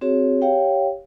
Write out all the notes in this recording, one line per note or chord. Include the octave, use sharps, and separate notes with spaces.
C4 F#4 G#4 C#5
G4 C#5 F5 G5